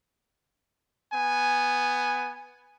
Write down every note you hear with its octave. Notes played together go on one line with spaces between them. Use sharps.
B3 G#5